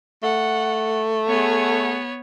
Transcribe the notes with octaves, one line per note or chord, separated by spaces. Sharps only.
A3 F#5
B3 G#4 C#5 F#5